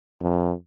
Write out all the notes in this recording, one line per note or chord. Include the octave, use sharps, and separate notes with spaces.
F2